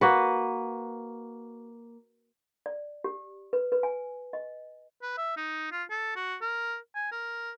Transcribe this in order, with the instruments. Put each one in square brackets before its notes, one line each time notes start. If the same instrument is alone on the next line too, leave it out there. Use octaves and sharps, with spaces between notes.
[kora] A#3 F#4 B4
[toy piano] D5
G4
B4
B4
G#5
D#5
[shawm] B4
E5
D#4
F4
A4
F#4
A#4
G#5
A#4